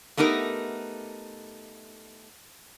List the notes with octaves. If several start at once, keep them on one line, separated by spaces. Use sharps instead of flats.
A3 B3 D#4 G4 A#4